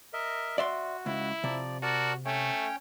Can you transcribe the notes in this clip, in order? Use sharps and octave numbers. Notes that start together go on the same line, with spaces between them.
A#4 D#5 E5
F#4 D5 E5 C6
C#2 E4
C3 F3 D5
F#4 A#4 D5 A5
A3 C#4 C#5 G5